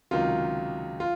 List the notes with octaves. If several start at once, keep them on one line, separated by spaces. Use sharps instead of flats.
C#2 C3 D#3 F#3 F4
F4